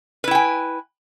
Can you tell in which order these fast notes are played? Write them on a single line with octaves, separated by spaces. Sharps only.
B4 E4 G5 G#5